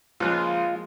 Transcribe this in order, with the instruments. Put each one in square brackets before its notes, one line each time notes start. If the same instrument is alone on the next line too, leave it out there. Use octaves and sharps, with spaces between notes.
[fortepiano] C#2 F#6 [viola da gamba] F3 G#3 A#3 [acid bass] F4